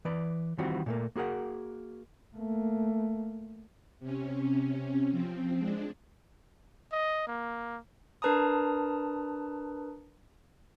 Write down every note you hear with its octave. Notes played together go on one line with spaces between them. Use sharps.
E3 B4 D5
D#3 E3 G3 C4 F4 F#4
A#2 A3 A#3
A#3 F#4 G#4 A#4 F#5
A3 A#3
C3 C#4
F3 C4
G#3 D4
D#5
A#3
D4 A#4 B4 A5 A#5 D#6